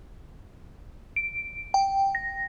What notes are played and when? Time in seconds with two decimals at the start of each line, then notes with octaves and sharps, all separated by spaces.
1.16 D7
1.74 G5
2.15 A#6